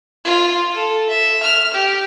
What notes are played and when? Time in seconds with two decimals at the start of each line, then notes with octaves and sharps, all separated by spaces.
0.25 F4
0.74 A4
1.09 E5
1.43 F6
1.74 G4